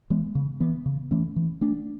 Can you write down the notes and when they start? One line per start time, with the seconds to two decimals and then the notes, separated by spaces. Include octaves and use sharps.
0.10 E3 G#3 B3
0.35 C#3
0.60 E3 B3
0.86 C#3
1.11 E3 A3 C#4
1.36 E3
1.61 A3 D4